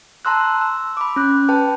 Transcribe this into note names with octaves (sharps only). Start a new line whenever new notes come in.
A5 A#5 C6 E6 F#6
E6
B5 D6
C#4 F#6
B4 G5 A5